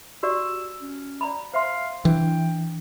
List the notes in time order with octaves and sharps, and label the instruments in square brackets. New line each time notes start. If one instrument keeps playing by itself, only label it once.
[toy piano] F#4 G4 D5 [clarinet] E6
[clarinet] C#4
[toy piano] D5 A#5 B5
[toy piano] C5 E5 C6 [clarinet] F5
[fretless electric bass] E3 [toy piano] D4 [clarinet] G5